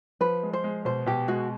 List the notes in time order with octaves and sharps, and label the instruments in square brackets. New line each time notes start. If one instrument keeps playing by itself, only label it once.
[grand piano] F3 [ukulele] B4
[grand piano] G#3
[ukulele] C5
[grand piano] G#3
[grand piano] B2 [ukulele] C5
[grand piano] B2 [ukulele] G4
[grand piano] G#3 [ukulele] F#4